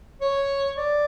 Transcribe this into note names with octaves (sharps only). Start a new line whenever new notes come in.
C#5
D5